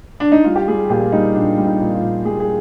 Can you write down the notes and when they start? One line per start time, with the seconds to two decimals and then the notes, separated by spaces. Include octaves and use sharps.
0.20 D4
0.32 D#4
0.44 G3 F4
0.56 G4
0.68 G3 G#4
0.90 A#2 G4
1.12 G3 D#4
1.35 A#2 D4
1.58 G3
1.66 D#4
1.81 A#2
1.95 F4
2.02 A#2
2.25 G3 G#4
2.40 G#4